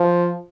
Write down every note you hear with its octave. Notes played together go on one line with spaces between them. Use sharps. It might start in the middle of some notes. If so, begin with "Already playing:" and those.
Already playing: F3